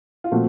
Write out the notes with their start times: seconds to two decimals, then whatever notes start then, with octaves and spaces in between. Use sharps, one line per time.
0.24 F4
0.31 A#2 F3 A3 C4 F#4